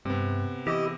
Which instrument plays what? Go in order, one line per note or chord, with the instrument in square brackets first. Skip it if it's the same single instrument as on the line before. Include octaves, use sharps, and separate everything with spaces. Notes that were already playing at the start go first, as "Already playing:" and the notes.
[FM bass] G2 [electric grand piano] C3 B3
[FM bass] E3 [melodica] E4 D#5 [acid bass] G4